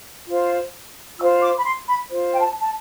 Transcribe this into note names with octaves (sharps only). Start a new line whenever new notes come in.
F4 C5
F4 C5 E6
D6
B5
C6
B5
F4 C5
G5
A5
A5